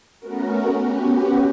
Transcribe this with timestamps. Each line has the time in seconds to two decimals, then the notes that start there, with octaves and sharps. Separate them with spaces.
0.19 A3 B3 C#4 F#4 A#4
0.79 B3 C#4 F#4 G4